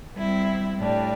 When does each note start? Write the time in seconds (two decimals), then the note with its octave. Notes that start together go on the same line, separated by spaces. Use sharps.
0.14 G3 C4 E4
0.78 A2 G3 D4